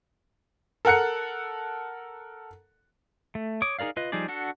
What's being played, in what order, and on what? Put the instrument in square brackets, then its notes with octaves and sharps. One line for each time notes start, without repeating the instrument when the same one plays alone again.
[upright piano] A4 A#4 F#5 F#6 C#7
[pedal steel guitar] A3
C#5 D6 D#6
D#4 G#4 A#4 D5 F5
F4 B4 D#5
F3 G3 D#4 G#4 D5
D4 F#4 A4 F#5